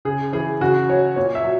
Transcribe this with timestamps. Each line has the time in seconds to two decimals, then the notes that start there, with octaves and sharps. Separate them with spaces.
0.05 C#3 G#4
0.33 E3 G#4
0.61 C#3 F#4
0.89 F#3 C#5
1.16 A#2 C#5
1.35 E5
1.44 F#3